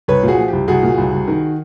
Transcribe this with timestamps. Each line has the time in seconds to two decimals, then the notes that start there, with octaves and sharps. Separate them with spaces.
0.08 C2 B4 C#5
0.23 A#2
0.28 F#4 G#4
0.38 F3
0.48 G4
0.53 C2
0.68 C2 F#4 G#4
0.83 A#2
0.98 C2
1.13 C2
1.28 D#3